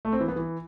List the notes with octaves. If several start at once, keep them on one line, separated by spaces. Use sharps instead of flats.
A3
C4
E3
B3
E3